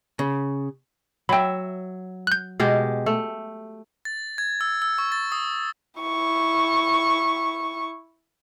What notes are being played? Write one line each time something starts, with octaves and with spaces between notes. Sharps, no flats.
C#3
F#3 E5 G5 B5
F#6 G6
B2 G#3 G4
A3
A6
G#6
E6
E6
C#6
A6
D#6
E4 C#6